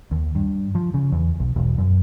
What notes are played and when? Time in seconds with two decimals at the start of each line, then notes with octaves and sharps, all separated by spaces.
0.11 D#2
0.35 G2
0.75 F3
0.94 C#3
1.12 E2
1.40 B1
1.56 E1
1.78 F#2